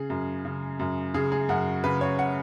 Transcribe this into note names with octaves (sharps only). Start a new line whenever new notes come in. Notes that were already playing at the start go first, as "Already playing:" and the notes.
Already playing: C#3 G#4
F#2
C#3
F#2
C#3 G#4
G#4
F#2 F#4
C#3 B4
C#5
F#5